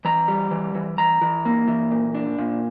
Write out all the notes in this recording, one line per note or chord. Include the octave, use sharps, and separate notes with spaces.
E3 A#5
G3
E3
E3
E3 A#5
E3
A#3
E3
A#2
D4
A#2